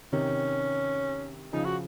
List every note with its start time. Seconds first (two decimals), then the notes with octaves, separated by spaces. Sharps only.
0.13 C3 D#3 C#4
1.53 C#3 F3 D#4
1.65 F#4